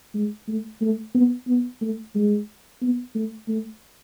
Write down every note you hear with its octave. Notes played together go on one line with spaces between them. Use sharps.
G#3
A3
A3
B3
B3
A3
G#3
B3
A3
A3